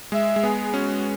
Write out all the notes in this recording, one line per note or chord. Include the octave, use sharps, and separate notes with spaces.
G#3 E5
G#3
B3 G#4
C#4 F#4